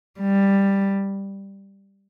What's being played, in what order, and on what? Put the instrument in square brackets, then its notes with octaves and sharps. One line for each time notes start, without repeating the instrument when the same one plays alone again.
[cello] G3